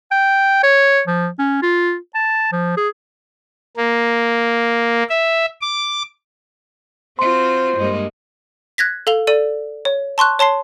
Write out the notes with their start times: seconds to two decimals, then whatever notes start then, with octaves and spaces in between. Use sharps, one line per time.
0.11 G5
0.63 C#5
1.07 F3
1.39 C#4
1.62 F4
2.15 A5
2.52 F3
2.77 G#4
3.76 A#3
5.09 E5
5.61 D6
7.19 C4 F4 F#4 C5 C6
7.77 G2 G#3 A#3
8.78 F#6 G#6 A#6 B6
9.07 A4 F5 F7 G7
9.27 A4 D5 D#7
9.85 C#5
10.18 A5 C6 C#6 F#6
10.39 C#5 A5 C6 C7